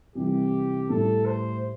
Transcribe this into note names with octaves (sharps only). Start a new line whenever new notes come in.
C2 C3 E3 G4
A2 G3 E4 A4
C5